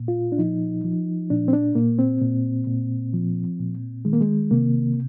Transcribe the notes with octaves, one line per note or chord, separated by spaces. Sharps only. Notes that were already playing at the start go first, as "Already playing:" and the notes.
Already playing: A#2
F4
D4
F3 D#4
F3
A#2 D4
C4
D4
A#2 A#3
C4
A#2
A#2
F3
A#2
D#3 G#3
A#3
G#3
C3 A#3